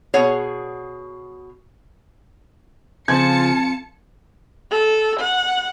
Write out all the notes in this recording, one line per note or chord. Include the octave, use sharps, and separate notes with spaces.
B2 G#4 C#5 F#5
F2 C#3 F3 F4 A5 G#6 C#7
A4
F#5